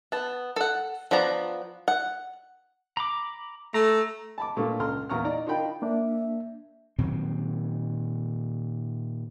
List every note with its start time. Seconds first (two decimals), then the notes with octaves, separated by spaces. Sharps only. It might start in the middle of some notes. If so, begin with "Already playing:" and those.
0.12 B3 A5
0.56 A4 F#5
1.11 F3 B3 D4 A#5
1.88 F#5
2.97 A#5 B5 D6
3.74 A3 A#5
4.38 A5 B5 D6
4.56 G2 A#2 A3 C#6
4.80 C#2 A4 A#5 C6 F6
5.09 E2 A#2 A#5 C#6 F6
5.24 D#4 D5 A#5
5.46 D4 D#4 F4 A#4 G5 B5
5.82 A#3 D4 E5
6.98 A#2 D#3 F#3 C4